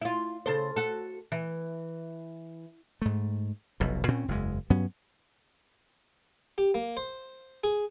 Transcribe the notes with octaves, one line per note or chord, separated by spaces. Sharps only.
E4 F4
C#3 A4 C5
F#4 A4
E3
G#2 A3
F1 B1 B2
A#2 C4 C#4
F#1 E2 G#3
G2 F#3 B3 C#4
G4
A#3
C5
G#4